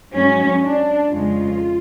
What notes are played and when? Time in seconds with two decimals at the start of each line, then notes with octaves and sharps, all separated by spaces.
0.12 G#2 F#3 C#4
0.62 D4
1.09 F2 C#3 F3 G#3 F4